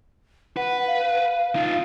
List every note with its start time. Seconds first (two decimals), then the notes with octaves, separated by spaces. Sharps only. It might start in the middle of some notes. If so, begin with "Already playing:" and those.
0.57 B4 F#5
0.87 F5
1.55 D#4 F4